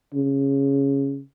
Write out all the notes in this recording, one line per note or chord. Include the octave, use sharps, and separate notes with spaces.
C#3